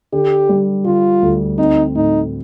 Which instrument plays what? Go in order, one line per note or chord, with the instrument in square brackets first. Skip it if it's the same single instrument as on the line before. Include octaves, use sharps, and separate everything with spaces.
[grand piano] D3 [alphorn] G4
[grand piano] G3
[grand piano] D3 [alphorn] F4
[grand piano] D2
[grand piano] C4 [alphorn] D#4
[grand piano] A2 [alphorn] D#4